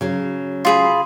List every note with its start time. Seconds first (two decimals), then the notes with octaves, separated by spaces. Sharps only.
0.01 C#3 F#3
0.65 F4 G#4 B5